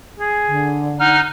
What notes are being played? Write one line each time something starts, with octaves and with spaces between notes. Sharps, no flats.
G#4
D3
D#4 F#5 F6